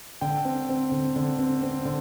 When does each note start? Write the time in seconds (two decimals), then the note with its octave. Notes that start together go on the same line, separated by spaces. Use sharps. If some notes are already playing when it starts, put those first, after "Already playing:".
0.21 D3 G5
0.45 C4
0.69 C4
0.92 D3
1.16 D3
1.39 C4
1.63 C4
1.85 D3